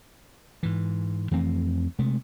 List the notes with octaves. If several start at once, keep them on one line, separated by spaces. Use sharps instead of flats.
G#2 E3
F2 E3 A3 C4
C3 G#3 A3